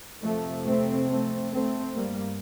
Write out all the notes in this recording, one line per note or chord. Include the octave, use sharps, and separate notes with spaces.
F2 C3 F3 A3
A3 C4
A3 C4
A3 C4
G2 G3 A#3